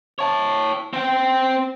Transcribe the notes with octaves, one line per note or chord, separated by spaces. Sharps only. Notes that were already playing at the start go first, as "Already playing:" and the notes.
C#5 A5
C4 G5